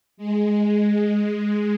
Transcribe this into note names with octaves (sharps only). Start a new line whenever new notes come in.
G#3